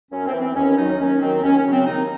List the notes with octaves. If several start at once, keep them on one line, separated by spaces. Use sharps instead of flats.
F#2 C#4
C4
E3
C4
D#2 C#4
D#3 F#3 D#4
D#2 C#4
D#3 F#3 C4
D#2 C#4
C#4
C#3 F#3
C4
D#2 D#4